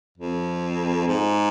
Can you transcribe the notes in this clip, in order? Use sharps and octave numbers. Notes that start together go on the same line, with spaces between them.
F2
G#2